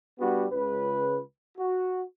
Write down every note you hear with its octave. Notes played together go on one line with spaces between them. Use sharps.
G3 B3 D4 F#4 G4
C#2 B4
F#4